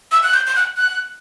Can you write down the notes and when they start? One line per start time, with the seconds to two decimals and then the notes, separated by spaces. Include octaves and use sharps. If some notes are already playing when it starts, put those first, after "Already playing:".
0.12 E6
0.23 F#6
0.34 G6
0.47 G6
0.55 F#6
0.77 F#6